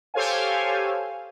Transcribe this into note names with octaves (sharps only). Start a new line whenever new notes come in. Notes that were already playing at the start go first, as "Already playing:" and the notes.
G4 A4 C5 C#5 F5 G#5